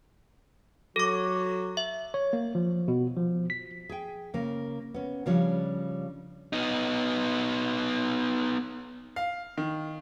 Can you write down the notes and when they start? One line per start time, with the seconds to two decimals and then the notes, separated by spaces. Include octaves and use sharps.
0.96 F#3 F#4 A4 D6
1.77 E5
2.14 C#5
2.33 A#3
2.55 F3
2.88 B2
3.17 F3
3.50 B6
3.89 G#4 G5
4.34 C#3 A#3
4.94 B3 C#4
5.26 C#3 F3 G3 D4 C#5
6.53 B3 D#4
9.16 F5
9.58 D#3